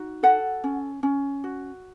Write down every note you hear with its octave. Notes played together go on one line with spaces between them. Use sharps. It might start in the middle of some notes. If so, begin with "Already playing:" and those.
Already playing: D#4 F#4
A4 F#5
C#4
C#4
F#4